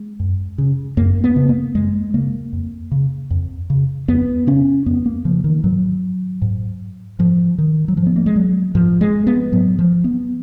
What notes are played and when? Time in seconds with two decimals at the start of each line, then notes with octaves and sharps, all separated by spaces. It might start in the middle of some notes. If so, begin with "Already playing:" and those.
Already playing: G#3
0.20 F#2
0.58 C#3
0.97 F#2 A#3
1.24 B3
1.36 C#3
1.49 A#3
1.75 F#2 G#3
2.14 C#3 A#3
2.53 F2
2.91 C#3
3.31 F2
3.70 C#3
4.08 F2 B3
4.47 C#3 C#4
4.86 F2 B3
5.06 A#3
5.25 C#3 F3
5.44 D#3
5.64 G#2 F#3
6.42 G#2
7.19 G#2 F3
7.58 D#3
7.88 F#3
7.97 G#2 F3
8.06 B3
8.16 A#3
8.26 G#3
8.36 F#3
8.75 G#2 F3
9.01 G#3
9.27 B3
9.52 G#2 F#3
9.79 F3
10.04 B3